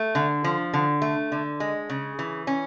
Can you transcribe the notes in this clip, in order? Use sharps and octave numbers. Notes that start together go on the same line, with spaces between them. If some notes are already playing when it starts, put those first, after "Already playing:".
Already playing: A3
D3
F3
D3
A3
D3
G#3
C#3
E3
C#4